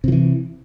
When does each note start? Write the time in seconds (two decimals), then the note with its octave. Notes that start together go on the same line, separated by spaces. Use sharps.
0.04 C3
0.08 F3
0.12 E3